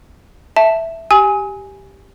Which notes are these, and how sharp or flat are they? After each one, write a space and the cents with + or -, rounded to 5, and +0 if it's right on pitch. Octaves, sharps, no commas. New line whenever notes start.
E5 +0 A5 +0
G4 +0 G#5 +0 D#6 +40